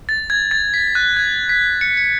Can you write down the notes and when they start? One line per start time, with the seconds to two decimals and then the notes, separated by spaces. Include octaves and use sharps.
0.09 A6
0.30 G#6
0.51 A6
0.74 B6
0.95 F#6
1.17 G#6
1.49 B6
1.81 C#7
1.97 C#7